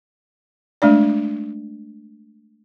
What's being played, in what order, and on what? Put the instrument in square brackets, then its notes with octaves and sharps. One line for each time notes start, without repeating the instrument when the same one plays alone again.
[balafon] G#3 A3 D4 D5